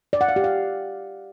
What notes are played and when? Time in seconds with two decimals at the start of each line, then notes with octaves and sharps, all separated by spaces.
0.13 D5
0.21 F#5
0.28 F5
0.36 G4
0.44 F5